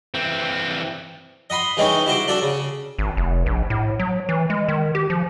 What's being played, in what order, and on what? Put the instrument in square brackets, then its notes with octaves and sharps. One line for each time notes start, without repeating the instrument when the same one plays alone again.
[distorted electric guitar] E3 C4
[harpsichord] D#5 F#5 B5 C6
E3 G#3 C4 C#4 D#4 C#5
E4 F#4 C5 D6
D4 F#4 A4 D5
C#3
[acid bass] G#1
F1
A#1
A2
F#3
E3
G#3
D#3
G4
F3